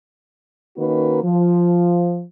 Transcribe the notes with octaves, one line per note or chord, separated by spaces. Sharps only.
D#3 A#3 C#4 D#4 F#4 B4
F3